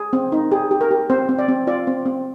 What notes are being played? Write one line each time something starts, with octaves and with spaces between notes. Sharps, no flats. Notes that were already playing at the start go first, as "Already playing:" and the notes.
Already playing: G#4
C4
D#4
G4 G#4
G4
A#4
G4
C4 C5
C4
D5
C4
F4 D5
C4
C4